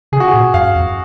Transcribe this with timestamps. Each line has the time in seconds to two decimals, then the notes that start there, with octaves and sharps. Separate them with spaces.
0.12 C#3 G#4
0.20 F#4
0.28 G#4
0.34 A#2
0.54 F#2 F5
0.76 F2